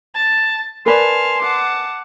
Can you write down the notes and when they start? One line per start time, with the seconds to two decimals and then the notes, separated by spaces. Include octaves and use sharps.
0.15 A5 A6
0.86 A#4 B4 D5 G#5 A5 C6 F6
1.42 F#5 A5 D6